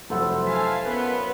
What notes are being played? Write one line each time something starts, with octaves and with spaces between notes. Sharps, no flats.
F1 F#3 E4 A4 C5 F#5 B5
F5 G#5 A5 B6
F#2 B3 B4 C6